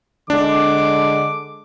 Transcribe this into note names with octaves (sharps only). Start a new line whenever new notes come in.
D3 G#3 D4 D6